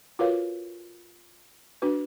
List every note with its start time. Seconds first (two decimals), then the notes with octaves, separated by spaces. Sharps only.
0.19 F4 F#4 A#4 B4 C#5 F5
1.82 D4 F#4 B4